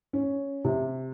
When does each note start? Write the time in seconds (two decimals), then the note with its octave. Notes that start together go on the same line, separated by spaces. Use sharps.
0.13 C#4
0.65 C3